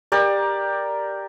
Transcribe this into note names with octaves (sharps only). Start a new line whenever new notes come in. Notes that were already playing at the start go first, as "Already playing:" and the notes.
G4 A#4 D5